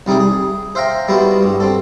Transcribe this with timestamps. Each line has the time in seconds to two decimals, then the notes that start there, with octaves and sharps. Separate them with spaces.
0.06 C2 G3 D#4 E4 G#4
0.20 G#4
0.75 C5 E5 F5 G5 A#5
1.08 G3 G#3 B3 E4 F#4
1.43 G2
1.60 C4 A4